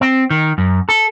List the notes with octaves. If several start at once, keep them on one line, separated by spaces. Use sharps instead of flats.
C4
D#3
F#2
A4